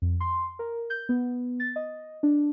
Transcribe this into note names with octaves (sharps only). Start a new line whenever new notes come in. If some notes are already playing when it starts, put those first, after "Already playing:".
F2
C6
A#4
G6
B3
A6
D#5
D4